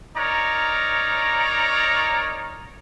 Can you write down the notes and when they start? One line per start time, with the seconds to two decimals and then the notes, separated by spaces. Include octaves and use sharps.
0.17 D#4 A#4 C#5 D5 A#5